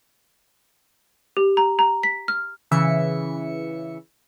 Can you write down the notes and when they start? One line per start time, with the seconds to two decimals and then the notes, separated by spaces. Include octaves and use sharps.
1.37 G4
1.57 A#5
1.79 A#5
2.03 B6
2.28 F6
2.71 C#3 E3 E5 C#7